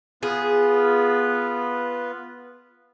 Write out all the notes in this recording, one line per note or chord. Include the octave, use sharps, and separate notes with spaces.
B3 F4 G#4 B4